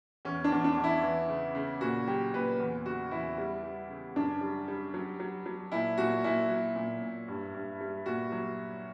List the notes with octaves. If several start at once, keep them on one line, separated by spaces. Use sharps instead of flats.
E2 C#4
D4
E2
D4
E2
E4
E3
C#3
C#3
A#2 F#4
F#3 G4
A#2 B4
E2
C#3 F#4
E2 E4
G3
G3
C#3
F#2 D4
G3
G3
F#3
F#3
F#3
A#2 E4
A#2 F#4
A#2 E4
F#3
A#2
A#2
G2
G2
G3
A#2 F#4
F#3